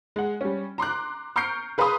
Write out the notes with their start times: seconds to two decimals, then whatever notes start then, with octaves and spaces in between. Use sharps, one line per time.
0.16 G#3 F#5
0.41 G3 C#4
0.78 A#5 C6 D6 F#6
1.36 A#5 C#6 F6 G6 C7 D7
1.78 G#4 B4 F5 A#5 C6 D#6